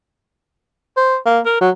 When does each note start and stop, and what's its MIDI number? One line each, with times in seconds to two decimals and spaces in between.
0.97 1.17 72
1.26 1.40 58
1.45 1.57 70
1.61 1.70 54